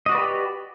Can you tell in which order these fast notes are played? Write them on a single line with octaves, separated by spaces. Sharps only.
D#5 F#4 D5 B4 G4